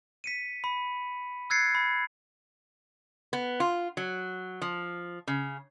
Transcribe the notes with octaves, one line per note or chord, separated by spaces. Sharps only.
B6 C#7 D#7
B5
E6 F#6 G#6 A6 C7 C#7
B5 G6
B3
F4
F#3
F3
C#3